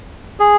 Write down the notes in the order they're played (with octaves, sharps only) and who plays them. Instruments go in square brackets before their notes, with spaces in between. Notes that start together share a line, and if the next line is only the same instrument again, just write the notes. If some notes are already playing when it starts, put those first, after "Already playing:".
[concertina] G#4